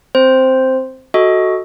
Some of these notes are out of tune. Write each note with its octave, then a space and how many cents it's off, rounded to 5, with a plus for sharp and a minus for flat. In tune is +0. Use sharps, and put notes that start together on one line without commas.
C4 +0 C5 +0
F#4 +5 A4 +0 D#5 +20